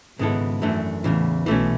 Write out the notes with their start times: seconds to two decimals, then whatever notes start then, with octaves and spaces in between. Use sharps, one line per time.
0.19 G#1 G#2 C#3 G#3 B3 E4 A4
0.62 F#2 E3 A3 D4
1.04 A1 E2 A2 C#3 E3
1.46 B1 B2 E3 A3 C#4